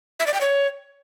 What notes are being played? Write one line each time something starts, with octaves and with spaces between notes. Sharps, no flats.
E5
D5
G5
C#5